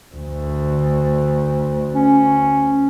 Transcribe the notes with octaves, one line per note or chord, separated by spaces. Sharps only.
D2
C#4